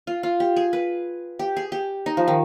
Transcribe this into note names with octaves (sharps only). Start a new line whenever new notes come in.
F4
F4
G4
G#4
B4
G4
G#4
G4
D#4
F3
D#3